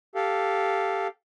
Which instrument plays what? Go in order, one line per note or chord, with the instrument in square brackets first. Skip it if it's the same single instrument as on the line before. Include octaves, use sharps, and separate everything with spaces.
[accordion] G4 A4 F5